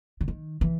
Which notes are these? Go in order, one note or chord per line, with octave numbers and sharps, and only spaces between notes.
D3
D#3
E3